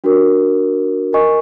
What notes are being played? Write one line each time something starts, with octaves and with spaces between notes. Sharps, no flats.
D4 F#4 A#4
A#4 D#5 G#5 C#6